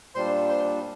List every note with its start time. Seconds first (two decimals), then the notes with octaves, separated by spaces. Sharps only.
0.15 A#2 G3 D4 C5 C6
0.49 C5 C6